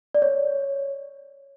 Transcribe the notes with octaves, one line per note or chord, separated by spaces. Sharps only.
D5
C#5